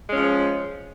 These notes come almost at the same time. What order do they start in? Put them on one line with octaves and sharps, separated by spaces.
G#3 C#4 F4 F3